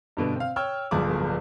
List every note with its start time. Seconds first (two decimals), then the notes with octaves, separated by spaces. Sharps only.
0.17 G2 B2 D3
0.36 C4 F5
0.56 C#5 G5 E6 F6
0.91 D1 G1 F3 B3 G#4 D6